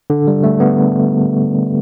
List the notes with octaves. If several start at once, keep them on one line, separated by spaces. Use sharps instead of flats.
D3
G3
A3
B3